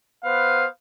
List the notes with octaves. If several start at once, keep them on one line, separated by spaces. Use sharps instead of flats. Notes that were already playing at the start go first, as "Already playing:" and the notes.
B3 B4 C5 F5